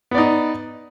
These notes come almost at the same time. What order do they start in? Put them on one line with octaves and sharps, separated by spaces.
B3 D5 D#4